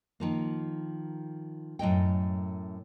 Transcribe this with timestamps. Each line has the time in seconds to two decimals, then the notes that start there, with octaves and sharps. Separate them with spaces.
0.20 D#3 F3 A#3
1.79 F#2 A2 D#5 G5